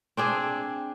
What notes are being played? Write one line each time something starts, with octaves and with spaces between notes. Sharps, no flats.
C4 D4 G#4